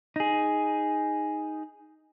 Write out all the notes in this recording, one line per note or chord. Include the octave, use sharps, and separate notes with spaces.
D#4 G#4